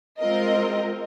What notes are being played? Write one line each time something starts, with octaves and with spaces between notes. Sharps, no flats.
G#3 C4 F4 A#4 D#5